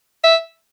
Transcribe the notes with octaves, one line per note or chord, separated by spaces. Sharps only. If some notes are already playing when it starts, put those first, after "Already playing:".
E5